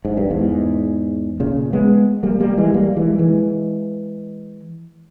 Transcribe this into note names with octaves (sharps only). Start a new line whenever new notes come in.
G#2
G2
E2 G#2
A#2 C#3
G#3 B3
G3 A#3
G3 A#3
E3 G#3
G3 A#3
E3 G#3
E3 G#3